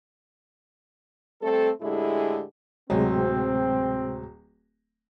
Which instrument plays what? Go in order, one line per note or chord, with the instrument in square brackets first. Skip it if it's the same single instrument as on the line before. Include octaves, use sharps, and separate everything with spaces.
[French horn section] G3 A3 C4 A4
A2 D3 G#3 E4 G4 G#4
[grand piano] D1 F#3 [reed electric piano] C3 G#3 [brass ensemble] C4